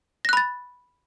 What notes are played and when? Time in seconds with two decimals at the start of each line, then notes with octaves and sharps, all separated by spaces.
0.25 A#6
0.29 F#6
0.33 B5
0.37 A6